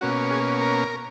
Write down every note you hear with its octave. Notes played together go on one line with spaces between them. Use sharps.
B2 A#3 C#4 F#4
G#4
A#4